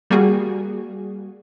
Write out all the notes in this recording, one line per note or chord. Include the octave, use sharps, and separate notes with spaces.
G3 A#3 F#4 G#4